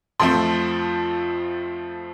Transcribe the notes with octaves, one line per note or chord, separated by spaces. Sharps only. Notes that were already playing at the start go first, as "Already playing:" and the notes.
F2 F3 A3 C4 C6